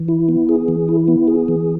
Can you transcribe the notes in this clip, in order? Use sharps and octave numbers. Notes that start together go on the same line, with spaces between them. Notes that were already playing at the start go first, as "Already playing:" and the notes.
Already playing: E3
E4
B3
G#4
E3
E4
B3
G#4
E3